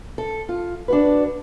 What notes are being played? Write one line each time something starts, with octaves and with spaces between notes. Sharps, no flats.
A4
F4
D4 F#4 B4